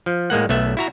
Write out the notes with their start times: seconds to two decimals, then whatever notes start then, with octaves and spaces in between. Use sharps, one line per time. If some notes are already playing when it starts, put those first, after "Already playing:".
0.06 F3
0.30 A2 G#3 A#3 F#5
0.49 B1 A3 B3 E5
0.77 E4 F#4 A#5